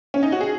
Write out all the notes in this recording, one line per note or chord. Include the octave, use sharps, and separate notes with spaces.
C#4
D#4
F#4
G#4